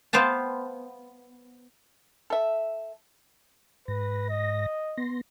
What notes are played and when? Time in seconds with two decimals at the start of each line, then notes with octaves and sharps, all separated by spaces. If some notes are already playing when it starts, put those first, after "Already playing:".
0.13 B3 C5 F5 G5 A5
2.30 A4 E5
3.88 G#2 B4 A#6
4.30 D#5
4.97 B3 C6 A#6